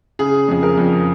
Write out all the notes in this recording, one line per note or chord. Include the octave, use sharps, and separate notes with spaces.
C#3 G#4
F2 G#4
A#4
F2